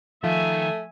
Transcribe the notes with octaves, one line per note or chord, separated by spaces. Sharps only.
D#3 F3 A3 E5 G#5